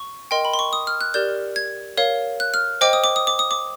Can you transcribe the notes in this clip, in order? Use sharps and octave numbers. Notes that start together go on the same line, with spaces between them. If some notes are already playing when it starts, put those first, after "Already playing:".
Already playing: C#6
A#4 D#5 G5 C6
B5
C6
C#6
D#6
F6
F#6
G4 A#4 D5 G6
G#6
A#4 C#5 F5
F#6
F6
C5 D#5 G5 D6
D#6
D6
D#6
D6
D#6
D6